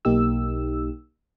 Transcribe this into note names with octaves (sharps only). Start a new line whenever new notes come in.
B1 A#3 D#4 G4 E6